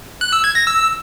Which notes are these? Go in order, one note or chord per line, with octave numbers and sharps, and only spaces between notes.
F#6
E6
G#6
A#6
E6